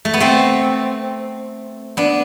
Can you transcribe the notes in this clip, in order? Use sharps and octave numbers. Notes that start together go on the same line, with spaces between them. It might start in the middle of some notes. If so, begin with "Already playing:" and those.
A3
B3
A3 C4
B3 D4